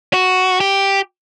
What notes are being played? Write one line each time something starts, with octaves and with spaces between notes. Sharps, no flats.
F#4
G4